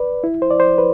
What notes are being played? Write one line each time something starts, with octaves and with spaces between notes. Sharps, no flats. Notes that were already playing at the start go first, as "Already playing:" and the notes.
Already playing: B4 D5
E4
C5
D5
C5
B4